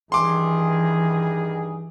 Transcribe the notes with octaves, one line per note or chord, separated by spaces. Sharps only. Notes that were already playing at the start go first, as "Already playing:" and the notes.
G2 D#3 E3 G#4 C6 D6